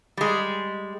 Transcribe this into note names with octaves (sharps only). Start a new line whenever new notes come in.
G3 G#3